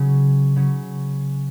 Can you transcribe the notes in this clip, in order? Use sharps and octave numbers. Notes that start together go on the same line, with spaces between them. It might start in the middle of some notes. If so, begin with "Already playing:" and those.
Already playing: C#3 F#3 C#4
C#3 F#3 C#4